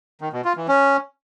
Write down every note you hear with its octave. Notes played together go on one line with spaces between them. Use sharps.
D#3
B2
F4
E3
C#4